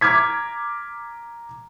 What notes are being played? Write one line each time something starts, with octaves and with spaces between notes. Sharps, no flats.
A#5 D6 F6 G#6 B6